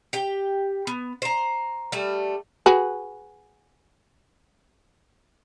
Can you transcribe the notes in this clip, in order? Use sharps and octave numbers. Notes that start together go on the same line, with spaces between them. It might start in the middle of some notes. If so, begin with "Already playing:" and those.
G4 G5
B3
C5 A#5
G3 A3
F#4 G#4 B4